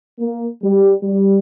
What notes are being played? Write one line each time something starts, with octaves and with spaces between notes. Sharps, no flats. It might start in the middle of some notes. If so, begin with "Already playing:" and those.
A#3
G3
G3